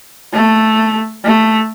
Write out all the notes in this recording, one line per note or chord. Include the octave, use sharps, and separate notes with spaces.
A3
A3